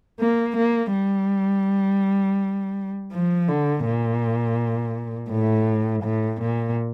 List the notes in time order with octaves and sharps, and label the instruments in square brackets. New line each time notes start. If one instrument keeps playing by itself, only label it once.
[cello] A#3
A#3
G3
F3
D3
A#2
A2
A2
A#2